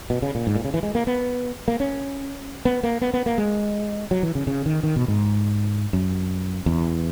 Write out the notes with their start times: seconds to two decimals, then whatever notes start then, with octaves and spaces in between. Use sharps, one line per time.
0.10 B2
0.22 C#3
0.35 A#2
0.47 G#2
0.56 A#2
0.65 C#3
0.74 E3
0.83 G#3
0.95 A#3
1.07 B3
1.68 A#3
1.80 C#4
2.65 B3
2.83 A#3
3.01 B3
3.14 B3
3.26 A#3
3.38 G#3
4.11 F#3
4.23 E3
4.35 C#3
4.47 C#3
4.66 D#3
4.83 D#3
4.96 B2
5.08 G#2
5.93 F#2
6.66 E2